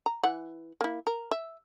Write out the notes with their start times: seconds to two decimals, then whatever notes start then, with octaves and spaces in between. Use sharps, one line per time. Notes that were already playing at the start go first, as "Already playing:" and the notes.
0.06 A#5
0.23 E3 F#5
0.81 A#3 E4
1.07 A#4
1.31 E5